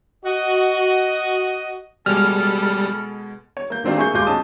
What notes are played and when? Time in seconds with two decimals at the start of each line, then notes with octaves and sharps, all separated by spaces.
0.26 F#4 D#5
2.06 B2 G3 G#3 A4 G#5 B5 F6
3.57 C#5
3.70 A#3 G6
3.84 D#3 A3 C4 D4 F4 C5
3.97 A#3 G#4 E5 C#6 G6
4.14 D#1 G#3 F4 D6 G6
4.27 B1 C#4 A5 D#6